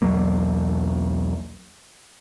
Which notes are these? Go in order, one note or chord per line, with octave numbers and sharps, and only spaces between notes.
B1 E2 F#3 A#3